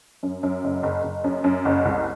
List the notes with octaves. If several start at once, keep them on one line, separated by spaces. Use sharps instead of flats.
F#2
F#2
F#1
F#1
F#1
F#2
F#2
F#1
C2